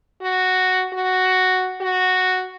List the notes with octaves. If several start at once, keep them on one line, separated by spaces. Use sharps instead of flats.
F#4
F#4
F#4